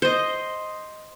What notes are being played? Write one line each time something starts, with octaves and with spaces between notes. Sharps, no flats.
C5 D#5